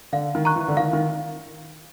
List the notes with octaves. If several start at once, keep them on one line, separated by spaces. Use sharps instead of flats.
D3 F5
D#3
A#5 C#6 F#6
E3
D3
D#3 F5
D#3